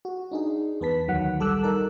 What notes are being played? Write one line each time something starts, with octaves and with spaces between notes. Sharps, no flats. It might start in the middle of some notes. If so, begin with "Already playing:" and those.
F#4
D4 D#4 G#4
E2 B3 B4 A5 B6
D2 D#3 F#3 F#5
A#1 G3 A4 D6 E6 F#6
D#4 A#4 A5